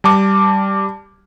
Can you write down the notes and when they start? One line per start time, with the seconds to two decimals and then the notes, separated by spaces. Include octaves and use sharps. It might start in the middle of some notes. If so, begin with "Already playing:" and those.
0.04 G3 A5 D6